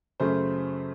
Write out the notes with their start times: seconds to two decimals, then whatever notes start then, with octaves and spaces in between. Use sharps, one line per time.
0.20 F#2 C#3 A3 C5